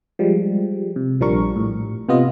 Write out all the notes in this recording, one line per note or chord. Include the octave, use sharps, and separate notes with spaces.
F3 G3 G#3
C3
A#1 F3 G3 D4 A#4 C#6
A2
C3 B3 F4 D#5